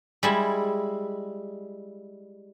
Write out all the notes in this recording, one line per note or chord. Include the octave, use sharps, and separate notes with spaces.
G3 G#3 E4